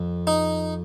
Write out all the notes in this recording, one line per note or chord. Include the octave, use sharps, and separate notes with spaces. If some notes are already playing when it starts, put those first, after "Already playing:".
Already playing: F2
D#4